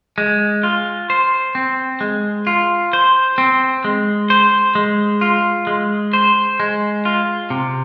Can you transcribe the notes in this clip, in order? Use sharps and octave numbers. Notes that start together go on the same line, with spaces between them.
G#3
F4
C5
C4
G#3
F4
C5
C4
G#3
C5
G#3
F4
G#3
C5
G#3
F4
C3